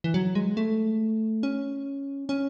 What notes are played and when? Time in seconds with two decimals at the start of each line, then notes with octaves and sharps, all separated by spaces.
0.04 E3
0.14 F#3
0.35 G#3
0.57 A3
1.43 C#4
2.29 C#4